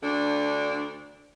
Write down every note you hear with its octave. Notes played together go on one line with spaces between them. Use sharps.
D2 D3 D4